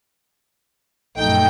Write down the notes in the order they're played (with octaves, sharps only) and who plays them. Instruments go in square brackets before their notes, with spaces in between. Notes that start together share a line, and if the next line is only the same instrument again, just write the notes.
[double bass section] A#1 F#2 [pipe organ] A3 D#4 [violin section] G5